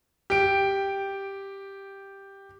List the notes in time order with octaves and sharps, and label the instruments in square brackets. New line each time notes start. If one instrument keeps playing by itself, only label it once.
[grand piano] G4 D7